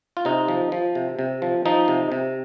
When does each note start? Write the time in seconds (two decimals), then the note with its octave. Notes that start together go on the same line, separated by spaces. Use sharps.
0.17 F4
0.25 C3 D#4
0.48 F3
0.72 F3
0.95 C3
1.19 C3
1.42 F3
1.65 F3 D#4
1.88 C3
2.12 C3